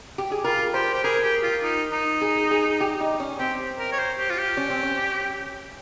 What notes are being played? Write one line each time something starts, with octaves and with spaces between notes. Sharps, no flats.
G4
G#4
F4 A#4
G4 C5
G4
G#4 A#4
G4
F4
D#4
D#4
G#4
G#4
G4
D#4
C#4
C4 G4
A#4
C#5
C5
G4
F4
G4
C#4
C4
C#4